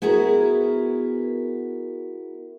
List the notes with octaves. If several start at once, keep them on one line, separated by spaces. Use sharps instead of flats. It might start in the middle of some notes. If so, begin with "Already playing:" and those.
B3 E4 F#4 G#4 A#4